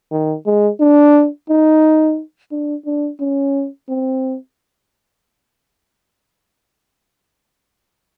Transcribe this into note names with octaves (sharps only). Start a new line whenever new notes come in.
D#3
G#3
D4
D#4
D4
D4
C#4
C4